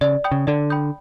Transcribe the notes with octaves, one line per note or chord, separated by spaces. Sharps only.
C#3 D5
G5 B5 D#6 G6
C#3
D3 D5
G5 B5 D#6 G6